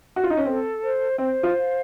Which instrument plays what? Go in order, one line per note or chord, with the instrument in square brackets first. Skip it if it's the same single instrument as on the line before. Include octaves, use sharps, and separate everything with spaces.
[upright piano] F#4
F4
D#4
C#4
[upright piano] C4 [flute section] A4
[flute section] C5
[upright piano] C4 [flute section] C5
[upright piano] F4
[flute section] F5